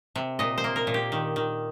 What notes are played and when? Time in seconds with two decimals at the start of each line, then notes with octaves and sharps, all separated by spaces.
0.16 C3
0.39 A#2 D#5
0.58 C5
0.64 A#3
0.76 A#4
0.87 A#2
0.94 G4
1.12 D#3
1.36 D#3